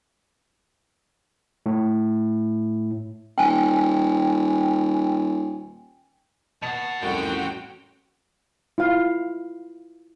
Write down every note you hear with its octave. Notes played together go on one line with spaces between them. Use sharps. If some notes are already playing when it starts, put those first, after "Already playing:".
A2
D#1 G5 G#5
B2 F#5 A5 C#7
C2 F2 A2 C#4 F#4 G5
E4 F4 F5